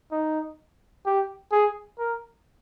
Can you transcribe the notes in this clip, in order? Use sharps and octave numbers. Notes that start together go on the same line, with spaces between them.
D#4
G4
G#4
A#4